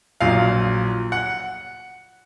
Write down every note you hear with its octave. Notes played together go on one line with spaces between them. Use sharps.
A#1 A#2 F#3 F5
F#5